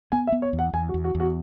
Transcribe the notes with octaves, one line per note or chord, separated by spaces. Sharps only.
B3 G#5
E5
B3
C#5
E2
F#5
E2 G#5
F#4
E2
F#4
E2
F#4